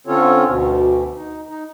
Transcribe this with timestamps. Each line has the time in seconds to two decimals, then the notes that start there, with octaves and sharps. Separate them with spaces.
0.07 D3 C4 C#4 F4 A4 C#5
0.46 D2 B2
1.16 D#4
1.49 D#4